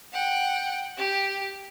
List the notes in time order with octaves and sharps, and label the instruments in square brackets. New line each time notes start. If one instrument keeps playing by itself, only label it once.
[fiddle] F#5 G5
G4